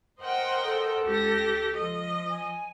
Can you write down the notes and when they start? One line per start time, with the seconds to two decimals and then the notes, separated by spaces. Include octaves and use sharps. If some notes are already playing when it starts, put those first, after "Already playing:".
0.21 A#4 C5 D#5 F#5 G5
0.64 A4
1.06 C#2 G4 A#6
1.78 F3 D#5
2.30 G#5